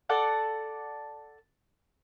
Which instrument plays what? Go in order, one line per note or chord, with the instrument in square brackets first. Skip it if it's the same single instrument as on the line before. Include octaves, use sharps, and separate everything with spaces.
[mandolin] A4 D5 F#5 A5